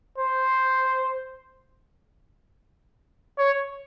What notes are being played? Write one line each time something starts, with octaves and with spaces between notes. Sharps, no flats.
C5
C#5